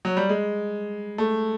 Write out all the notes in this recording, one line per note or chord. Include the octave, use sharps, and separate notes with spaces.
F#3
G3
G#3
A3